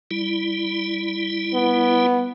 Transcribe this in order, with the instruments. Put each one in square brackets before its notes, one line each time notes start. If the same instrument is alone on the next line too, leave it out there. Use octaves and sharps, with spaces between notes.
[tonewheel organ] G3 E4
[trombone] B3